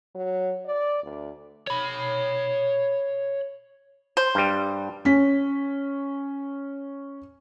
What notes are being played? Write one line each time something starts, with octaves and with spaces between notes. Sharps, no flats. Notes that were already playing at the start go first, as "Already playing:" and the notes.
F#3
D5
D2
C#5 B5
C5
G2 G3
C#4 B6